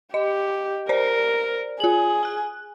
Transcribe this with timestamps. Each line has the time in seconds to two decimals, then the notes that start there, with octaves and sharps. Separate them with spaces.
0.14 G4 D#5
0.89 A#4 C5 D5 A#5
1.80 F4 G#4 F#7
2.23 G#5 F#6